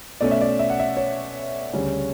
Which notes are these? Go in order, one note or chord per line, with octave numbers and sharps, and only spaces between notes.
B2 A3 C#4 D5
E5
D5
E5
F#5
E5
C#5
D2 C#3 G3 C#4